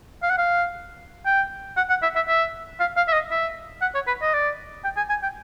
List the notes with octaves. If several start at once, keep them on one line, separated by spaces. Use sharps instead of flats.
F5
F#5
F5
G5
F#5
F#5
E5
E5
E5
F5
F5
E5
D#5
E5
F#5
C#5
B4
D#5
D5
G5
G#5
G#5
G5